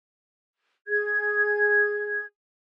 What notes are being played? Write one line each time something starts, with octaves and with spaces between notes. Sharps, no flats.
G#4 G#6